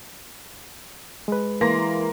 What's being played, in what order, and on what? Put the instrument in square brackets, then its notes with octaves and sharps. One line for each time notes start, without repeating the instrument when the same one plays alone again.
[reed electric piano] G#3 B4
[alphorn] E3 [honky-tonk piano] A#3 C6 A#6